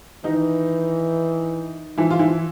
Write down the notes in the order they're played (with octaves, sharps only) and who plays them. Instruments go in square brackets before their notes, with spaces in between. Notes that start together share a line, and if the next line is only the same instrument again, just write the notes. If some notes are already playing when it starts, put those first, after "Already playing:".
[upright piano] D#3 D#4 [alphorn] E3
[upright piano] E3 E4 [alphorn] F3
[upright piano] F4
E3 E4